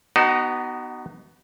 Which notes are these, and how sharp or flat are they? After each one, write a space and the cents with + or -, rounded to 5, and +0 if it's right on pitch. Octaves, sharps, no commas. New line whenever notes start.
B3 +0 D#4 -20 F#4 +30